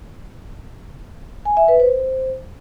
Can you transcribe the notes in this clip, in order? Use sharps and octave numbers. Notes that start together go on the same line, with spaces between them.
G#5
E5
B4
C5